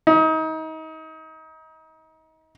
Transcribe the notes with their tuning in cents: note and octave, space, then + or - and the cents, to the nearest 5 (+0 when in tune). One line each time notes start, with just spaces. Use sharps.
D#4 +30